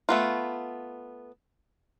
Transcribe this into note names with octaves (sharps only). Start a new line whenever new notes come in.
A3 B3 F4